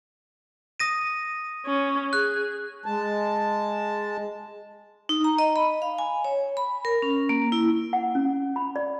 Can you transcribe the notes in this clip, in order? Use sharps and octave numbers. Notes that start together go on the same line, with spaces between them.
D#6 A#6 D#7
C#4
G#4 F#6
G#3 A5
D#4
A#5
D#5
B5
F5
G#5
C#5
B5
A#4
C#4
A#3
E4
F#5
C#4
B5
D5